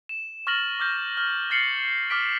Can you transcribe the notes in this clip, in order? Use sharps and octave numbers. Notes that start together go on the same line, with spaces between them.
E7
C#6 F6 A6 A#6 F#7
D6 F6 G6 A#6
F6
F6 A6 C7 C#7 F#7
D6 F6 B6 D7